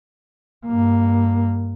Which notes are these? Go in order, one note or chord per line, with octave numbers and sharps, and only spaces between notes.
G2 A#3